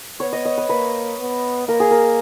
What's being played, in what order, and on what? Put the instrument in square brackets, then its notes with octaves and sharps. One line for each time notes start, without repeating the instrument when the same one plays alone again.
[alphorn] B3 [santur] C#5
[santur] D#5
D#5
B4
[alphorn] A#3 [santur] B4
[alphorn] B3
[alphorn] A#3 [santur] A#4
[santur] G#4
A#4